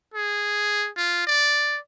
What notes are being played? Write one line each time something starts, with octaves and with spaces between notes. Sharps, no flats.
G#4
F4
D5